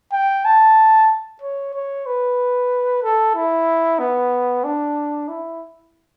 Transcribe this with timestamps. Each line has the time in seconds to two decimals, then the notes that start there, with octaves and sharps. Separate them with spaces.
0.12 G5
0.45 A5
1.42 C#5
1.74 C#5
2.07 B4
3.03 A4
3.35 E4
3.99 B3
4.64 D4
5.29 E4